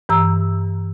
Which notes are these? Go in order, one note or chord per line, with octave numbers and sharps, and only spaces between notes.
G2 E3 A#5 E6